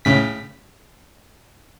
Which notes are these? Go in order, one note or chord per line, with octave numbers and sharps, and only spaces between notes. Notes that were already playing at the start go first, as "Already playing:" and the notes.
A2 C#3 B6